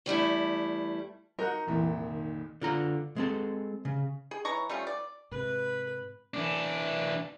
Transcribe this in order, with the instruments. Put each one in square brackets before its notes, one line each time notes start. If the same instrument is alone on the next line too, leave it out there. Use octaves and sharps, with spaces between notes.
[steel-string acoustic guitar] E2 G3 A3 E4
[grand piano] D#4 F#4 F#5 [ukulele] A#4
[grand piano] C2 F2 A#2 [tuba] E3
[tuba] D#3
[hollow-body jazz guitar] D3 F4 A#5
G#3 C4 A4
C#3
[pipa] G#4
E3 C#5 A#5 C#6
G3 A3 C#4 F4
D5
[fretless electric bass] G#2 C3 [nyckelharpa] B4 B5
[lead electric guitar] E3 D4